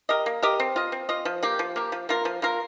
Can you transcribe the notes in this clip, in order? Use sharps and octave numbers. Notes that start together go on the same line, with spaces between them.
G4 A#4 D#5
A#3
G4 A#4 D#5
C4
F4 D#5
C4
F4 D#5
F3
A#3 G4
F3
A#3 G4
F3
A#3 F4 A#4
F3
A#3 F4 A#4